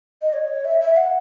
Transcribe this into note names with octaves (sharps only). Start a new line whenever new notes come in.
D#5
C#5
E5
E5
F#5